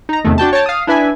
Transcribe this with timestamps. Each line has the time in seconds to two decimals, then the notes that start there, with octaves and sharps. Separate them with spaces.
0.09 D#4 A#5
0.25 E2 C3 D#3 A3
0.38 D4 F#4 G5 A5
0.53 C#5 G5 A5
0.66 F5 D#6
0.87 D4 E4 B4 E5 G#5